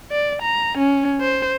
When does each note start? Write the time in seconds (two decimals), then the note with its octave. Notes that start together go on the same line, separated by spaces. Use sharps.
0.11 D5
0.42 A#5
0.78 C#4
1.21 C5